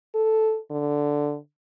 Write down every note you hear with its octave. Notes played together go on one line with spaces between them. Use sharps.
A4
D3